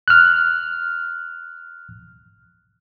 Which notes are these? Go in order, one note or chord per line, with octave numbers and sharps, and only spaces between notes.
F6 F#6